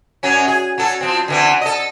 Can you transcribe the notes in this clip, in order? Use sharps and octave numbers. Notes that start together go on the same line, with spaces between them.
F#2 F#3 C#4
G#4
F#3 A4
F3 C4
D3 E3 C4
A4 D#5